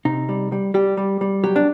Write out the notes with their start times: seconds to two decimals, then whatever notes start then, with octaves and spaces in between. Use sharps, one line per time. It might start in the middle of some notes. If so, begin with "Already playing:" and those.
0.05 C3 D#4
0.29 G3
0.52 G3
0.74 G3 G4
0.97 G3
1.21 G3
1.44 F#3 G4
1.56 D4